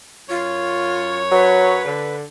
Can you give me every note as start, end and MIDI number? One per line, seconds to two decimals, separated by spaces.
0.30 1.85 42
0.30 1.20 65
0.30 1.85 73
1.32 1.90 54
1.32 2.15 71
1.85 2.23 50